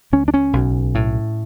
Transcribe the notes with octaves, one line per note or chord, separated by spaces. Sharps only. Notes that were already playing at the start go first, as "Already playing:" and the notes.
C#2 C#4
D4
C#4
B1
A2